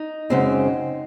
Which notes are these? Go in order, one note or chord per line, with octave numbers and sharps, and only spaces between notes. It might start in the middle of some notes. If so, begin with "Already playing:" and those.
Already playing: D#4
F#2 C#3 G#3 C4